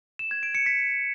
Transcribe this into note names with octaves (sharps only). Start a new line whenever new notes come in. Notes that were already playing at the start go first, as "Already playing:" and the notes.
E7
G#6
D7
C#7
B6